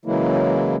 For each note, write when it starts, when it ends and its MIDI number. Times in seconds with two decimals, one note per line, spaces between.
0.05 0.76 49
0.05 0.76 52
0.05 0.76 54
0.05 0.76 56
0.05 0.76 58
0.05 0.76 64